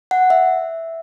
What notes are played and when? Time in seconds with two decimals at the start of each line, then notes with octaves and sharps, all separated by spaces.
0.11 F#5
0.30 E5